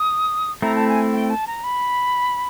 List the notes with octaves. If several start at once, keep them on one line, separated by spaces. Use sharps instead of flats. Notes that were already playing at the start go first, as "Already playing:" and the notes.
Already playing: D#6
A3 C4 E4 A#5
A5
G#5
G5
A5
A#5
B5